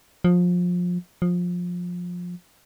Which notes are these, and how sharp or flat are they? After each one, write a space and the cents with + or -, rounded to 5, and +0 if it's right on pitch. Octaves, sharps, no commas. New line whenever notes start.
F3 +25
F3 +20